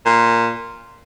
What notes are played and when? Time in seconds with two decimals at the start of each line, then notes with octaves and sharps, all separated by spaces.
0.06 A#2